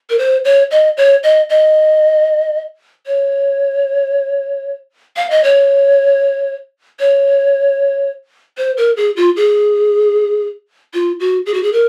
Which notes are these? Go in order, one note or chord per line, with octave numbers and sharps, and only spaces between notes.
A#4
C5
C#5
D#5
C#5
D#5
D#5
C#5
F5
D#5
C#5
C#5
C5
A#4
G#4
F4
G#4
F4
F#4
G#4
F#4
G#4
A#4